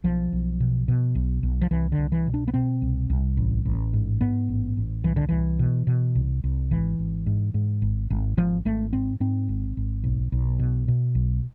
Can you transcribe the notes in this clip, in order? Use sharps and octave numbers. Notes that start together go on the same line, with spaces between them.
B1 F3
B1
B2
B2
B1
B1
F3
C2 E3
D3
C2
E3
B2
D4
B3
B2 C4
C2
C2
A1
A1
G#2
G#2 B3
A1
A1
C2 E3
D3
C2 E3
B2
B2
C2
C2
G#1 E3
G#1
G#2
G#2
G#1
G#1
G#1 F3
G#1 A3
G#2 C4
G#2 C4
G#1
G#1
B1
B1
B2
B2
B1